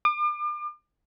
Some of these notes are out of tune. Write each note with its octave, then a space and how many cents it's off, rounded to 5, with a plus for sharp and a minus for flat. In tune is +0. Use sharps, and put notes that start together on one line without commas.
D6 +40